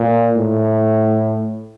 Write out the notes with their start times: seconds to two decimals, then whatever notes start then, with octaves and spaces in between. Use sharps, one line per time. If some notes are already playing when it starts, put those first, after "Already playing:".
Already playing: A#2
0.37 A2